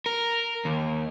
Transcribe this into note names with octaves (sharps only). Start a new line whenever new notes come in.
A#4
D#2